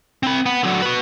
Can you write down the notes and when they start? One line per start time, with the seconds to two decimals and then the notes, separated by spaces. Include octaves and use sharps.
0.23 C4 B5
0.46 B3
0.63 D3 F#3
0.82 F#4 B4